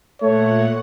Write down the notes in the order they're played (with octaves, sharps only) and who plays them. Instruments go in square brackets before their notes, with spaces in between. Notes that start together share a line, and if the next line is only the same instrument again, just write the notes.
[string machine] A#2 F#5 [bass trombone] A3 [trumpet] C#5